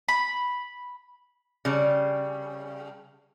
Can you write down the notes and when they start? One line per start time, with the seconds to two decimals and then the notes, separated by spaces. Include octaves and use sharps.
0.09 B5
1.65 C#3 G3